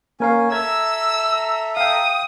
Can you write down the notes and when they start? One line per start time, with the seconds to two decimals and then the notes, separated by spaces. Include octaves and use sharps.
0.20 A#3 C#4 A#4 F5 G#5
0.52 A4 E5 A#5 E6 G#6
1.77 F5 G5 D#6